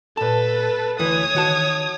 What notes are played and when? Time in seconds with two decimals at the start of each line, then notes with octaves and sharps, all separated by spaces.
0.17 A#2 A4 B4 A5
0.99 D2 E3 B4 C#5 D#6
1.35 D#3 F#4 A5